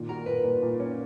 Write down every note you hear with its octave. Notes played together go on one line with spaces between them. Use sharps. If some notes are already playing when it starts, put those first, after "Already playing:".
Already playing: A#2 D#3
F#4 A#4
A#2 B4
A#2
A#2
C#4